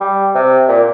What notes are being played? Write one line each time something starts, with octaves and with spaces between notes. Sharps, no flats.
G3
C3
A#2